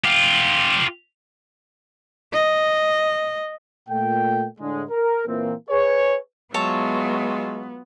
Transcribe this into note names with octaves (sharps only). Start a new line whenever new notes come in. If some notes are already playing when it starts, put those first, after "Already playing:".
F4 G4
D#5
A#2 A3 G5
A2 D3 G#3
A#4
A#2 E3 A#3 C4
G#4 B4 C#5
F#3 G#3 B3 F4 C#5 E5 A5